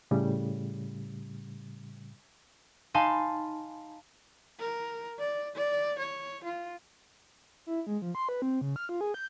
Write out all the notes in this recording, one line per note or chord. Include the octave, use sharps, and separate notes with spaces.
A2 C#3 G3
D#4 F5 G#5 A5 B5 C6
A#4
D5
D5
C#5
F4
E4
G#3
F3
C6
B4
C4
C#3
F6
F4
G#4
G6